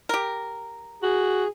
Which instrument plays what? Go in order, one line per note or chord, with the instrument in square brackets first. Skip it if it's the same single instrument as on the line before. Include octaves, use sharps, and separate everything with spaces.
[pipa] G4 A#4
[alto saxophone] F#4 [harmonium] G#4